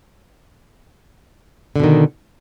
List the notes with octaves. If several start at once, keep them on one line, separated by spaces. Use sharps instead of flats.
B2 D3 D#3